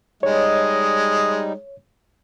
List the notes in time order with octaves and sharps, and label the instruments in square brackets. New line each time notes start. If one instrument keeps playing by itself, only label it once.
[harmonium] G3 D#4 [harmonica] G#3 [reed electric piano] C#5 [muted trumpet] D#5